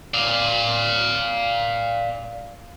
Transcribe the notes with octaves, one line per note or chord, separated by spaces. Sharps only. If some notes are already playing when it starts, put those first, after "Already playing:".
D5 F5